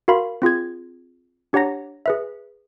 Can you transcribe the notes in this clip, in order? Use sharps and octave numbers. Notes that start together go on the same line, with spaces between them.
F#4 A#4 F5 B5 C6
C4 F4 G#4 G#6
D4 G4 C#5 F#5 A#5 A#6
G#4 B4 E5